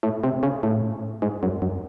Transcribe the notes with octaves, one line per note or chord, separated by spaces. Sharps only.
A2
C3
C#3
A2
G#2
F#2
F#2